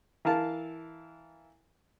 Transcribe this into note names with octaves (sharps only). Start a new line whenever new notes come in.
E3 A#4 F5 A5